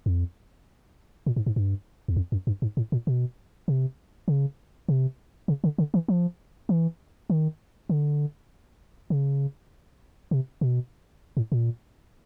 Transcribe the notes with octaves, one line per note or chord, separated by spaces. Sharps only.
F2
A#2
G#2
G#2
G2
E2
F2
F#2
G2
G#2
A2
A#2
B2
C3
C#3
C3
C#3
D3
D3
E3
F3
E3
D#3
D3
C#3
C3
B2
A2
A#2